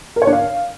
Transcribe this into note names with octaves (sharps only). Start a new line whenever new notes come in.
A#4
C#5
D4
F5